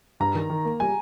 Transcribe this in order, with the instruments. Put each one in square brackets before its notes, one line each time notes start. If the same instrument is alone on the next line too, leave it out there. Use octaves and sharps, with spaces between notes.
[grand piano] G2 [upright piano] A#5
[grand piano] D#3
D#3
A#3
[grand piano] G3 [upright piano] G#5